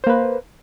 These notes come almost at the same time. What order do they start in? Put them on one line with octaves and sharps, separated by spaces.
C5 A#3 B4